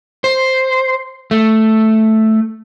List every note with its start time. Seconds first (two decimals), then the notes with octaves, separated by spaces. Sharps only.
0.24 C5
1.31 A3